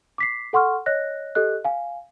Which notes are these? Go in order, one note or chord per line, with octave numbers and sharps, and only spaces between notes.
D6 B6 C7
A4 F#5 C6 C#6 F6
C#5 D#5 F#6 A#6
G4 A4 D#5 F#6
F5 G#5